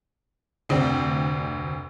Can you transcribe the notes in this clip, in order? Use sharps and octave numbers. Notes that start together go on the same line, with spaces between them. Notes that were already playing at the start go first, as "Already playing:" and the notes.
F1 D2 C4 D5 G5